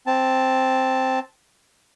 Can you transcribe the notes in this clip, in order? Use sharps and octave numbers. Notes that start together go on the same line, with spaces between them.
C4 A5